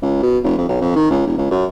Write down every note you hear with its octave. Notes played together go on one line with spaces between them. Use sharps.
C#2
B2
F1
F2
B1
F2
D#3
C#2
E1
C#2
F#2